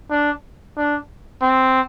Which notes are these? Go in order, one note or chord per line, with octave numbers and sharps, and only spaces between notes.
D4
D4
C4